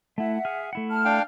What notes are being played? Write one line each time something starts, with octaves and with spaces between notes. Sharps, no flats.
A3 E4 E5 F#5
G#4 F6
A3 E4 F#5
A5 F6
D4 F5 G5